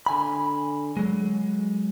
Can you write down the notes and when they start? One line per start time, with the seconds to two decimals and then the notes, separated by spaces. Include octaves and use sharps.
0.06 D3 G#5 B5
0.97 F#3 G#3